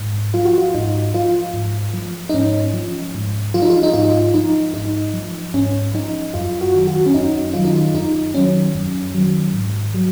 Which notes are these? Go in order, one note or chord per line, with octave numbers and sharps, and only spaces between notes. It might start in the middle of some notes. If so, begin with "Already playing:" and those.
Already playing: G#2
F3 F4
F#4
F4
G#2 D#4
F3 F4
G#2
F3
D#4
G#2 C#4
F3
G#2
F3 F4
D#4
F4
D#4
G#2 F4
F3 D#4
G#2 D#4
F3
G#2 C#4
F3 D#4
F#2 F4
F#4
D#3 F#3
F#4
C#4
F#2 D#4
D#3 F#3 F4
D#4
F4
F#2 D#4
D#3 F#3 C#4
F#2
D#3 F#3
G#2
F#3